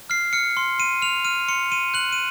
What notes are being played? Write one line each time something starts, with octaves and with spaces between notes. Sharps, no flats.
F6 C7
F6 C#7
C6
C6 D#7
F6 F7
F6 D#7
C6 C#7
C6 D#7
F#6 F#7
D#7